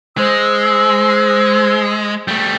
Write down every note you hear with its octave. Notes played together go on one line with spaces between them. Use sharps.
G#3 C5 E6
G3 A3